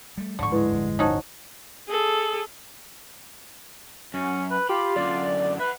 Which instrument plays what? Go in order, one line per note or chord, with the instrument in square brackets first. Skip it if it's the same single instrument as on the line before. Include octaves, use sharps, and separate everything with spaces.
[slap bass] G3 A3
[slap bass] D1 G#2 F3 [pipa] D3 C#6
[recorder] G#3 [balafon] E4 B4
[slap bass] D1 G1 F3
[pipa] C#4 D#4 F#4 [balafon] C5 A5
[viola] G#4 A4
[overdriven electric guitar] F#2 [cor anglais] C#4
[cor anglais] B4
[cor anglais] F4 [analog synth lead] G4 [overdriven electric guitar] B5
[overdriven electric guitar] F#2 D3 [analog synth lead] D5
[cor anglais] B4 [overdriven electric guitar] E5 F#5